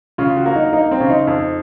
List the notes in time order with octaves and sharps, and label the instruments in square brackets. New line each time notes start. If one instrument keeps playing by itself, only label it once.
[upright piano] C#3 [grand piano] F4
[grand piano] F#4
[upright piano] A#3
[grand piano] D#4
[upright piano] A#3 [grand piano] D#4
[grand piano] C4
[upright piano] C#3
[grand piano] D#4
[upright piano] F2